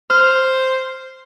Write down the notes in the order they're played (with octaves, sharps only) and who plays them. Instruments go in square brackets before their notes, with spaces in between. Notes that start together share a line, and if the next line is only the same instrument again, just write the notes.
[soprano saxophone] C5 [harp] F6